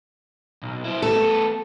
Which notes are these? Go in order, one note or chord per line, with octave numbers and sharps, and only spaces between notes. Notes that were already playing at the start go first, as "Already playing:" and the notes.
B1
E4 C5
A3 B3 A4